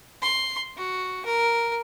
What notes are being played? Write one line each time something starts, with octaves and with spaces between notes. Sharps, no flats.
C6
F#4
A#4